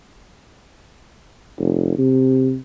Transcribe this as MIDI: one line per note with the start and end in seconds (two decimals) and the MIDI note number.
1.59 1.97 29
1.98 2.57 48